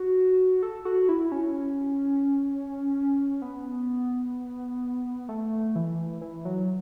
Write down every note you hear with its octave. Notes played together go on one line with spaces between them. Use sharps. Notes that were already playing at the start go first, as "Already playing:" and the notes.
Already playing: F#4
A4
F#4
E4
C#4
B3
A3
E3
E3
F#3